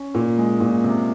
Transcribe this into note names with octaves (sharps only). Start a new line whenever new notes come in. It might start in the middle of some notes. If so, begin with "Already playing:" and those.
Already playing: C#4
A#2
G#3
A#2
C3